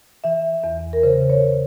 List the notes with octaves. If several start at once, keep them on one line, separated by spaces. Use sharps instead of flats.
E3 E5
E2
A#4
C#3 C5
C#5